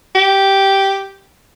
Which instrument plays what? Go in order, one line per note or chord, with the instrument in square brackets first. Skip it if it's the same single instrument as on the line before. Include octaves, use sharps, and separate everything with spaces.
[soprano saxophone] G4